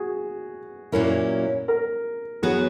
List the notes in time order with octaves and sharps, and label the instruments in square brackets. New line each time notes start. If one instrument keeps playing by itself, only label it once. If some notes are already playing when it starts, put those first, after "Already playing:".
Already playing: [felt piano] F#4 G#4
[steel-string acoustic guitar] A#2 F#3 A#3 C#4 E4 [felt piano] A#4
[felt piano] A#4
[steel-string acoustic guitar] F#3 B3 F#4 B4 [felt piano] G#4